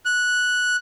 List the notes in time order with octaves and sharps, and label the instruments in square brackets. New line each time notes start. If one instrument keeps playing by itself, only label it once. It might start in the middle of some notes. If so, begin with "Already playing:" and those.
[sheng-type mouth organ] F#6